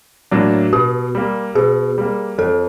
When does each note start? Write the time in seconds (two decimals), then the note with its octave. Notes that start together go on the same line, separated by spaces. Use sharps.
0.31 A2 F#3 A#3 D4
0.73 B2 G4
1.15 G3 A#3
1.55 B2 G#4
1.98 G3 A#3
2.38 F2 A4